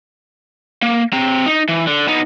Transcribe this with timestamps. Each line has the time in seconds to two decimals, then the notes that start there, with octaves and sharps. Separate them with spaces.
0.82 A#3
1.13 C4 A#5
1.46 D#4
1.69 E3
1.87 D3
2.08 B3 D#4